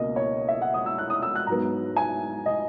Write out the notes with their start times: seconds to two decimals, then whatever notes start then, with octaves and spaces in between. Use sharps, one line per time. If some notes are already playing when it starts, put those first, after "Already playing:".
Already playing: C#2 B2 A#3 D#5
0.16 C#5
0.48 E5
0.61 F#5
0.74 D#6
0.86 E6
0.98 F#6
1.10 D#6
1.22 E6
1.36 F#6
1.47 G#2 F#3 B3 A#5
1.96 G#5
2.46 D#5